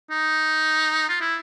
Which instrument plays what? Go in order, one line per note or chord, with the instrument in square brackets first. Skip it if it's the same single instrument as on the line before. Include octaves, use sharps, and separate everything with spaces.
[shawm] D#4
F4
E4